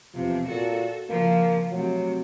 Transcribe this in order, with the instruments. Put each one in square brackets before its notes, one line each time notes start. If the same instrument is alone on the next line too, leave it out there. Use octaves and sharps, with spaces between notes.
[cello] E2 C3 [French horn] F3
[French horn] A#2 [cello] F#4 A4
[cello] C#3 F3 [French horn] A#3
[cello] C3 A3 [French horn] F#3